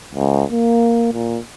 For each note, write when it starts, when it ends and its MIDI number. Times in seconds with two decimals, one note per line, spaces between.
0.15 0.44 37
0.52 1.10 58
1.14 1.39 46